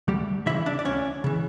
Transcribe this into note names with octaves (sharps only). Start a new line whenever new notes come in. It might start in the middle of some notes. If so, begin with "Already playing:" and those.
D2 G3 G4
C#3 E3 E4 E5
D4 D5
D5
D2 C#4 C#5
C#3 E3